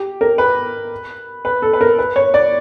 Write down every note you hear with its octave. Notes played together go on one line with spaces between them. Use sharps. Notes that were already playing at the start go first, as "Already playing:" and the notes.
Already playing: G4
A#4
B4
B4
A4
B4
A#4
B4
C#5
D5